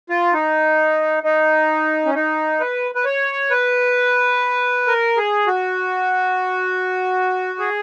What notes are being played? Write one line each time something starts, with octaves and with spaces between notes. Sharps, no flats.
F4
D#4
D#4
C#4
D#4
B4
B4
C#5
B4
A#4
G#4
F#4
G#4